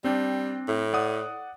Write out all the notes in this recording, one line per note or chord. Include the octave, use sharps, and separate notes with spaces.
G3 C4 D4
A2
D5 F#5 D#6